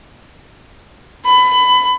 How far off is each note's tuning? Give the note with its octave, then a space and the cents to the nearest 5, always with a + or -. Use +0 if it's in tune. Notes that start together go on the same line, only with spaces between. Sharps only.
B5 +20